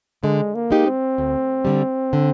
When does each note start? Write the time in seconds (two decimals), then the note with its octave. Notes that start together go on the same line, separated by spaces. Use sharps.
0.23 D3 G#3
0.55 A#3
0.70 G#3 D#4 G4
0.87 C4
1.18 D2
1.65 D3 G3
2.13 D3